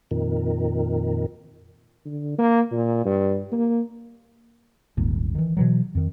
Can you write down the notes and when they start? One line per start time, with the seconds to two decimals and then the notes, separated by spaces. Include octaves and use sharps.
0.11 F2 A#2 D#3
2.05 D3
2.38 A#3
2.71 A#2
3.05 G2
3.52 A#3
4.97 D#1 G#1 D#2
5.35 D#3 E3
5.57 B2 E3 F#3
5.95 F2 D#3